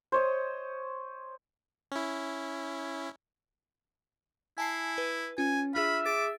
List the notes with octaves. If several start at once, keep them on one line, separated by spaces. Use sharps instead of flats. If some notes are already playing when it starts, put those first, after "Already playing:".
C5 C#5 D#5
C#4 E4
E4 G#5 A5 C7
B4
C#4 F4 G#5
D4 F4 G#4 E5 B5 F6
G#4 D6 A6 D7